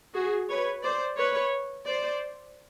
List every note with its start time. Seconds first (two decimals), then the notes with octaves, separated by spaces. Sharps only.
0.14 F#4 G#4
0.49 B4 C#5
0.83 C5 D5
1.18 B4 C#5
1.87 C5 D5